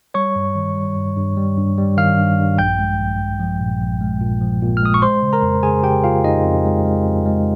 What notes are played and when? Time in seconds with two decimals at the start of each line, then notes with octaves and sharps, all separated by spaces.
0.14 G3 C#5 C#6
0.36 G2
0.55 D#3
0.76 G3
0.97 G2
1.16 G2
1.37 G3
1.57 G2
1.78 G3
1.97 D#3 F5 F6
2.18 G2
2.39 G2
2.58 A#1 G5 G6
2.79 G#3
2.99 A#1
3.20 A#1
3.40 F3
3.60 A#2
3.81 A#1
4.01 G#3
4.21 A#2
4.41 F3
4.62 A#2
4.77 F6
4.82 G#3 D#6
4.94 C#6
5.02 G#3 C5 C6
5.22 C#3
5.33 A#4 A#5
5.43 F2
5.63 C#3 G#4 G#5
5.83 C#3 G4 G5
6.04 C#3 F4 F5
6.24 F2 D#4 D#5
6.44 F2
6.65 G#3
6.85 G#3
7.06 F2
7.26 G#3